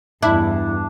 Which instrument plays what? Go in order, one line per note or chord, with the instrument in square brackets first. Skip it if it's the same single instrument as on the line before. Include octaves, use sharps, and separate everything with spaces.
[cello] E2 G2 [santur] D4 [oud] E4